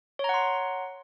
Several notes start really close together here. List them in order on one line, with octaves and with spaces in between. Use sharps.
C#5 A#5 F#5 C6